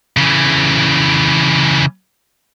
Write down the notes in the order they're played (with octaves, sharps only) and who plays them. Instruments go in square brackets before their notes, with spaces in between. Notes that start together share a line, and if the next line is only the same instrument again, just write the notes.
[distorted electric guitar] C#3 E3